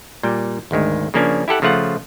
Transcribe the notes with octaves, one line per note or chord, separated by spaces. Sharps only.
A#2 G3 G5
G#1 D2 D#3 G#3
C#3 F3 A#3 C#4 D4
E4 G4 A4 F#5
C#3 F3 A3 F4 F#5